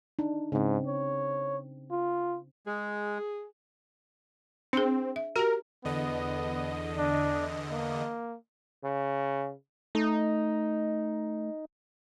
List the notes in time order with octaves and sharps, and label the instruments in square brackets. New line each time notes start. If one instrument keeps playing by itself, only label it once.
[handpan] D4 D#4
[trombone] G#2 [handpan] C#3 C4
[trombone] C#5
F4
[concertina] G#3 [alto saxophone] G#4
[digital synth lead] C4 [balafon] D4 G#4
[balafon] E5
[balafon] F#4 G4 [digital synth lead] A#4
[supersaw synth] E2 D3 D#5 [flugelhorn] B3
[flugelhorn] D4
A#3
[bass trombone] C#3
[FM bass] A3 [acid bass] D#4